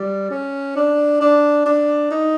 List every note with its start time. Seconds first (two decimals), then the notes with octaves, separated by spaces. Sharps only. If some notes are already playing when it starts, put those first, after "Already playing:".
Already playing: G3
0.30 C#4
0.76 D4
1.21 D4
1.66 D4
2.11 D#4